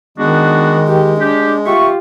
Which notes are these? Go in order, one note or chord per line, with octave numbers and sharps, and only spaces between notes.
D#3 G#3 B3 D4 F#4
G4
D4 G4
F4 G4 E5 C#6